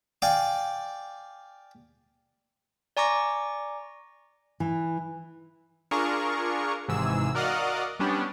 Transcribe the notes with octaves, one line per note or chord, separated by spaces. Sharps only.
D5 F5 G5 G#5 D6
D5 G#5 A#5 C#6 D6 A#6
E3
D4 F4 G#4 A#4 C#6
G#1 G#2 C3 E3 G#4 E6
F#4 A#4 D5 D#5 F5 F#5
G3 B3 C#4 D4 G4